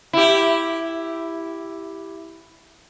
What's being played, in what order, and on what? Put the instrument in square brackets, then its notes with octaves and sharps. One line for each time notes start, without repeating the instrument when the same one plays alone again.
[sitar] E4 G4